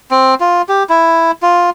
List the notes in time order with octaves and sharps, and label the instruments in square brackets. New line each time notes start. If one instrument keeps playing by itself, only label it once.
[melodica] C4
F4
G4
E4
F4